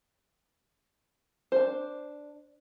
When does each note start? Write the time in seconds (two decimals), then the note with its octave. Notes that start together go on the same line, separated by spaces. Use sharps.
1.52 D4 C5